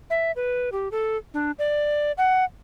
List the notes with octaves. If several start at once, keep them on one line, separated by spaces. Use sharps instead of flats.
E5
B4
G4
A4
D4
D5
F#5